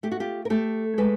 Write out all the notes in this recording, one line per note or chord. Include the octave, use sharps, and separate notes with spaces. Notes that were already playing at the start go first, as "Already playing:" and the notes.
A3 G4
F#4
F4 G4
A#4
A3 G4 A4
G#3 A4 B4